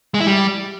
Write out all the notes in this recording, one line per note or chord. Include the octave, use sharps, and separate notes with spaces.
G#3
E4
G3